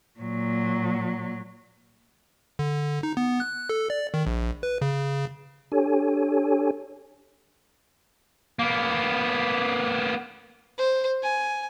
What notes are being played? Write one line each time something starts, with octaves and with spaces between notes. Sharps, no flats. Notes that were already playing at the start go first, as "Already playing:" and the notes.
A#2 F#3
D3
D#4
B3
F#6
A4
D5
D#3
A#1
B4
C#3
D4 G4 A4 C#5 G#5
A#3 B3
C5
G#5